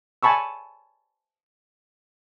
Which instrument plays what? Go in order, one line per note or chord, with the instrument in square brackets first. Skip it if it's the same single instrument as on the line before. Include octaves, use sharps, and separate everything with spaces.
[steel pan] G#5 A5 B5 C#6 E6